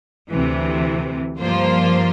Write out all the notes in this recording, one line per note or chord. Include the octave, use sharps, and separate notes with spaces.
D2 C3 E3
G2 F3 A#3 F4 C5